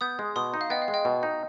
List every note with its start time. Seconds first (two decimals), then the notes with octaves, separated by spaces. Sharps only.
0.01 B3 D#6 G6
0.19 G#3
0.36 B2 C6 D#6
0.54 D#4
0.61 F5
0.70 B3 D#5 G5
0.82 F5
0.88 G#3
0.94 D#5 G5
1.05 B2
1.23 D#4